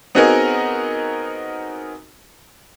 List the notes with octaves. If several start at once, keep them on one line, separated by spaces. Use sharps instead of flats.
B3 C4 D#4 F#4 G#4 A#4